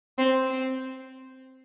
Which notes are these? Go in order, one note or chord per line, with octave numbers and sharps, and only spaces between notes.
C4
C4